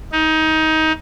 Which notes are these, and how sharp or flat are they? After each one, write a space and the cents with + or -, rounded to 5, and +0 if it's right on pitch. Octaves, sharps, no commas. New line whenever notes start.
D#4 +20